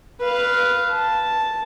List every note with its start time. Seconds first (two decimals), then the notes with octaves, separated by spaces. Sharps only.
0.22 B4 F5
0.93 A5